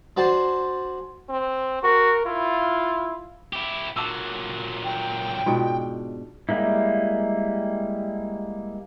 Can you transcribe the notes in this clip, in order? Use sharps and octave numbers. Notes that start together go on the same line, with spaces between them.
D4 F#4 C5 G#5 A5 C6
C4
F#4 A#4
E4 F4
E4 G4
A#2 F#3 A5 D6 E6
G5
G#2 B2 D4 F4 A5
G3 G#3 A#3 E4